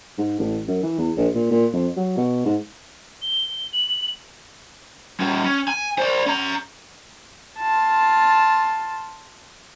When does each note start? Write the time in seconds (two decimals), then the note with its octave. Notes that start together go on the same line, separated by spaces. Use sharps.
0.18 G#2
0.39 A1
0.68 F#2
0.83 E3
0.98 E2
1.17 A#1
1.35 A#2
1.51 A#2
1.73 F2
1.97 F#3
2.17 B2
2.46 G#2
3.22 G7
3.73 F#7
5.20 G3 C#4
5.44 C#4
5.68 G#5
5.98 C5 D5
6.26 C#4 A#5
7.59 F4 A5